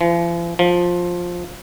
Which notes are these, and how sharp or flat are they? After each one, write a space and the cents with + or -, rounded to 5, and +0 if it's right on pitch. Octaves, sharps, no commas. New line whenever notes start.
F3 -45
F3 +10